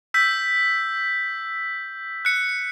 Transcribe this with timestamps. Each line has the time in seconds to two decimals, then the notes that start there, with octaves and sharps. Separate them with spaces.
0.14 E6 G6 B6
2.25 F#6 C#7